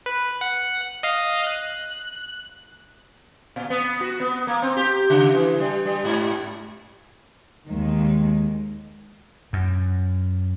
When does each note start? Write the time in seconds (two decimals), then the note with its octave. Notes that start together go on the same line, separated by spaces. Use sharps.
0.06 B4
0.41 F#5
1.03 D#5 F5 C7
1.47 F#6
3.56 A#2
3.70 B3
4.01 F#4
4.20 B3
4.47 A#3
4.62 C4
4.77 G4
5.10 C#3
5.33 E3
5.60 G3
5.85 G3
6.04 G#2
7.67 D#2 D#3 G#3
9.53 F#2